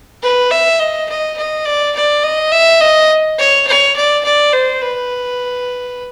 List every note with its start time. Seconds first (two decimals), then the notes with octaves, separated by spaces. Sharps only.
0.23 B4
0.51 E5
0.80 D#5
1.09 D#5
1.38 D#5
1.66 D5
1.95 D5
2.23 D#5
2.52 E5
2.81 D#5
3.39 C#5
3.67 C#5
3.96 D5
4.25 D5
4.53 C5
4.82 B4